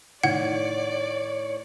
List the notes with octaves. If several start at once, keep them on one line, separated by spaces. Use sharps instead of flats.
A2 D#3 C#5 D5 F#5